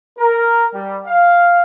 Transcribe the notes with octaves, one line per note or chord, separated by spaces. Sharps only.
A#4
G3
F5